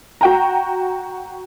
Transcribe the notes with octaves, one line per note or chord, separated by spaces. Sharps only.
F#4 G5 A#5